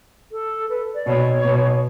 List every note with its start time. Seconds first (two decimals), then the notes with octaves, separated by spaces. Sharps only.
0.32 A4
0.69 B4
0.95 D5
1.07 B2 C#5
1.45 B2